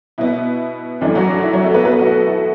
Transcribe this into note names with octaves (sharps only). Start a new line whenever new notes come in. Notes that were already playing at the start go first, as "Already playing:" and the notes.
B2 B3 E4
F#2 E3 A3 D4
F#3 F#4
D4
F#4
E4
F#3 F#4
A3 A4
B3 B4
B2 B3 B4
A4
F#4
A3 A4
E4